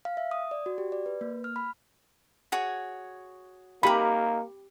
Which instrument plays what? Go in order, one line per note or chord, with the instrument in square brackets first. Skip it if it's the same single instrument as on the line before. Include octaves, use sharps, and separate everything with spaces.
[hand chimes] F5
E5
D#6
D5
F#4
G4
D5
B4
A#3
F6
B5
[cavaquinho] F#4 G#4 C#5
[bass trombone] A#3 [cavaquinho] D#4 A#4 [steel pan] G4 B5